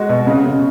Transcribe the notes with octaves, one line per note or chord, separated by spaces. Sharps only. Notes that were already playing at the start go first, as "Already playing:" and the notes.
Already playing: G#3 F#4
B2
C#3
C#3